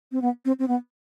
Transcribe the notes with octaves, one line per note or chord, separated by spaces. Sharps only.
C4
B3
C4
C4
B3